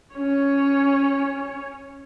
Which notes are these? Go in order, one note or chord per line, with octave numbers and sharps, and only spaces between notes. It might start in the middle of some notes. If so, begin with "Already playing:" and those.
C#4 C#5